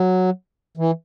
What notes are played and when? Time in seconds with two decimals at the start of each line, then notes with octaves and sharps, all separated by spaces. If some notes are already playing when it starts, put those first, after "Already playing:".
Already playing: F#3
0.77 E3